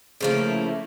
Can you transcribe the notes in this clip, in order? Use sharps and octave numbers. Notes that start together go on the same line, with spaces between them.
C#3 F3 A3 A#3 E4